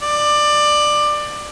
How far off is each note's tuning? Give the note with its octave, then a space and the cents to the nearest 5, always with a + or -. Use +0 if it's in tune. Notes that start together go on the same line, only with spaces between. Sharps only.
D5 +20